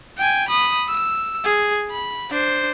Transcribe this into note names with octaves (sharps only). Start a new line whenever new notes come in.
G5 G#5
B5 D#6
E6
G#4
B5
D4 C5